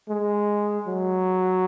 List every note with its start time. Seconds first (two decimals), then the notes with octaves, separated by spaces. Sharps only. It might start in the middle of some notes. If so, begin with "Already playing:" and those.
0.09 G#3
0.88 F#3